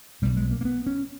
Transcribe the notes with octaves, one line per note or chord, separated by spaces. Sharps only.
B1 B2 G3
G#3
A#3
A#3
B3
C#4